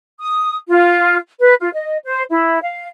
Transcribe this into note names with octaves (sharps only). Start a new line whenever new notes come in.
D#6
F4
B4
F4
D#5
C5
E4
F5